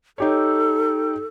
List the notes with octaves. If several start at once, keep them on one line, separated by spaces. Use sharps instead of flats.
D#4 G4 A4 C#5